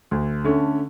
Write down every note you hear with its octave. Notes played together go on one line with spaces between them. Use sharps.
D2
D3 A3 C#4